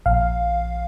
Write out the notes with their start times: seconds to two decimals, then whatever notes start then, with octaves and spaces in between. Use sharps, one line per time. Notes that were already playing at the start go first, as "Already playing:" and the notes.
0.06 A#1 F5